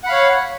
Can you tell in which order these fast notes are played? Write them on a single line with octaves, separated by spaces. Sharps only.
F#5 B5 F5 C#5